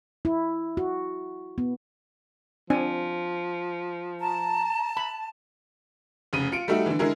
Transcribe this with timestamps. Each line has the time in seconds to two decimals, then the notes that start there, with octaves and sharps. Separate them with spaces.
0.25 E4
0.77 F#4
1.58 B3
2.70 F3 C4 D4 G#5
4.21 A5 A#5
4.97 B5
6.33 F1 C#3 D#7
6.52 F4 C#7 D7
6.68 G3 A3 D#4 F#4 E5
6.86 D3 E3
6.99 D3 G#3 E4 G#4 A#4